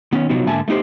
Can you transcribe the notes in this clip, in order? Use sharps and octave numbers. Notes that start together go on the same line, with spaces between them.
D#3 B3 C#4
C3 F3 F#3 B3 D#4 F#4
G#2 D3 A#3 E5 G#5 A5
A3 B3 D#4 G4 C5